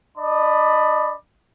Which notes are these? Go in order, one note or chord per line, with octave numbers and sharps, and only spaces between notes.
D4 D5 D#5 B5